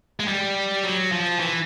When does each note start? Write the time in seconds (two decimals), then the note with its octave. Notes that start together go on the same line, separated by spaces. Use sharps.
0.20 G#3
0.28 G3
0.83 F#3
1.12 F3
1.39 E3